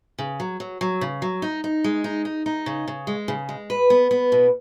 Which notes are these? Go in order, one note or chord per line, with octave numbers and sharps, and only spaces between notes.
C#3
F#3
F#3
F#3
C#3
F#3
D#4
D#4
G#3
D#4
D#4
D#4
C#3
C#3
G#3
C#3
G#3
B4
B3
B3
B2